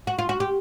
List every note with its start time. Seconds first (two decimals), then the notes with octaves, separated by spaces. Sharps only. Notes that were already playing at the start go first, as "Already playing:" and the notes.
0.07 F#4
0.19 F4
0.29 F#4
0.40 G4